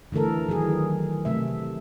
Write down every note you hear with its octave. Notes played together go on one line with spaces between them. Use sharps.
D3 E3 A3 A4 A#4
D#3 E3 F#3 G#4
C3 A3 E5